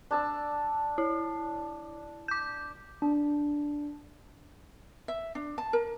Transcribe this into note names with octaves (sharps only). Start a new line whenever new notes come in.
D4 A5 E6
E4
D6 G6
D4
E5
D4
A5
A#4